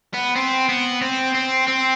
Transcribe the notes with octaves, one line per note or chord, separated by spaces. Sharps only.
B3
C4
B3
C4
C4
C4